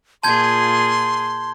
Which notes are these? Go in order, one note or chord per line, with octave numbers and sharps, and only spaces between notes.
A#2 F4 G#4 A5 C6 G6 G#6